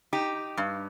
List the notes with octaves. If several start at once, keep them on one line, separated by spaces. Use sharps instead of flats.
D#4 G4
G2